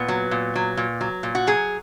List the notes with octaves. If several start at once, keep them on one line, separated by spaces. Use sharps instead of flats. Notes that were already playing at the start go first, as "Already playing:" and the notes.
Already playing: A#2 B3
F#3
A#2
F#3
A#2
F#3
A#2
F#4
F#3 G#4